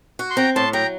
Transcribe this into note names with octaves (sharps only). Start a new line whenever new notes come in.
F#4
C6
C4 G5 A#5
A2 A5 C6
F#3 G5 A#5